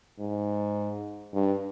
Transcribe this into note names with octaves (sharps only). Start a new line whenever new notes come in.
G#2
G2